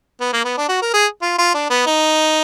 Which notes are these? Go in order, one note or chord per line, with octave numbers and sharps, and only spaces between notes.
B3
A#3
B3
D4
F#4
A#4
G#4
F4
F4
D4
B3
D#4